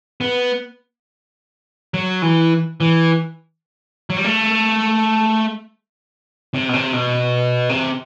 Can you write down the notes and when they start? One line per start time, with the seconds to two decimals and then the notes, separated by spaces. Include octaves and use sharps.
0.21 B3
1.94 F#3
2.22 E3
2.81 E3
4.10 F#3
4.17 G3
4.24 A3
6.54 C3
6.69 B2
6.73 C3
6.93 B2
7.69 C3